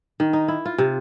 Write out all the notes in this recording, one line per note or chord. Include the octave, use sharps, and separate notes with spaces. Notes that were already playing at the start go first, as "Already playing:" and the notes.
D#3
D#4
E4
F4
C3